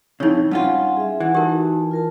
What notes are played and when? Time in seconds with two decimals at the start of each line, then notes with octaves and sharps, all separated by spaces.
0.20 F2 C#3 D#4 E4 C#5
0.51 G2 C#4 F4 F#5
0.97 G#4 E5
1.20 E3 F#5
1.35 D#4 F#4 G4 A#4 A5
1.91 F4 A#4 A5